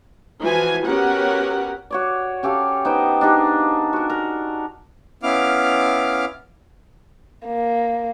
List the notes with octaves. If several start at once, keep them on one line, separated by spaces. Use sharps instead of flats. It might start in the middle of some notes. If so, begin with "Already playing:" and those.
E3 F3 F#4 G#5
B3 C#4 F#4 G4 A#4 F#5
F#4 C#5 D5
C#4 G4 A4 F5
B3 D#4 C5 G5
D4 D#4 G4 G#4
F#4 A#4
A#4
B3 C#4 E4 F5 D6 F6
A#3